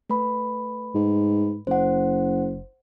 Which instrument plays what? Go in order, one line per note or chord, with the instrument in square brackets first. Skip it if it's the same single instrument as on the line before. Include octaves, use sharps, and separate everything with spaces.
[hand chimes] A3 B4 B5
[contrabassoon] G#2
[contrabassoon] F#1 [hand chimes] C5 F#5